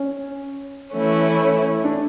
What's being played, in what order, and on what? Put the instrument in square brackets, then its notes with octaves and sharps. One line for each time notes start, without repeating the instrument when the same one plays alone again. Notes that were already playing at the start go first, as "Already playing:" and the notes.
Already playing: [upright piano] C#4
[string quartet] E3 A3 C#4 E4
[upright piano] D4